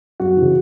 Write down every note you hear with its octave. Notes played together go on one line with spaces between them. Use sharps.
F#2 F#4
C#3 E3